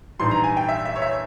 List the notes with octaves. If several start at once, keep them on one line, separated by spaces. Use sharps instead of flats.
A#1 G#2 E3 G3 C6
A#5
G#5
G5
E5
E5
C#5
E5